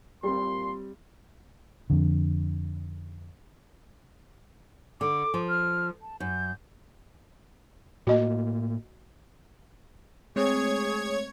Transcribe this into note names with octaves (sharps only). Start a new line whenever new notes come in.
A#2 G3 C4 C6
F2 D3
D3 D6
F3
F6
A5
F#2 G6
A2 A#3 F#4 D#5
G#3 A3 C4 G#4 C#5 G#6